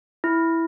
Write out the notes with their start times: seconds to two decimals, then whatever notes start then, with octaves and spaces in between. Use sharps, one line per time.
0.24 E4